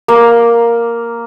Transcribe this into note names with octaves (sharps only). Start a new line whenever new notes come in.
A#3